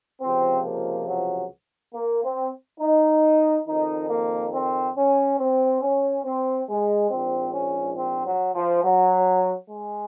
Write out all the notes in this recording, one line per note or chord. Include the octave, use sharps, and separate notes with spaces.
C#2 C3 F3 C4
A#3
F#3
A#3
C4
D#4
F2 D#3 D#4
A#3
C4
C#4
C4
C#4
C4
G#3
A#1 G#2 F3 C4
C#4
C4
F#3
F3
F#3
G#3